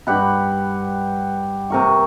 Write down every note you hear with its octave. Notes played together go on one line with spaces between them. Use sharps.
G2 G4 F#5 B5
C3 A#4 C#6